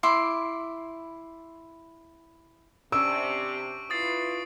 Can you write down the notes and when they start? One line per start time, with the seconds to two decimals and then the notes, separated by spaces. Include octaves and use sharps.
0.03 E4 C6 D6
2.92 C3 C#4 D4 D5 C#6 E6 D7
3.90 E4 F4 B4 D#6 A6 C7